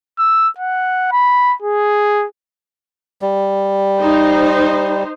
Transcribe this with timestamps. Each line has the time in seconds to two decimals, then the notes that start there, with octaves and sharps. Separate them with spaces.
0.19 E6
0.58 F#5
1.12 B5
1.62 G#4
3.22 G3
3.99 D#4 C5